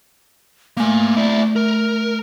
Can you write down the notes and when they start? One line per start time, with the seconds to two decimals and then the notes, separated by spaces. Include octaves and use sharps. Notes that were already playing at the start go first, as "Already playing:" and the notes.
0.77 A3 A#3 G#5
1.17 E4 D5
1.56 A#4